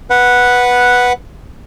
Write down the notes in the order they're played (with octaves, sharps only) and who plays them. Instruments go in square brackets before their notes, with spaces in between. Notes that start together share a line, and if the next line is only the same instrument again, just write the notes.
[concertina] B4 F#5